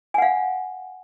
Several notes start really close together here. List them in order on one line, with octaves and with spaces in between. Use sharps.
G#5 F#5 F5